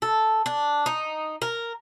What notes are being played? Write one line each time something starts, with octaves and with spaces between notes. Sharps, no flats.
A4
D4
D#4
A#4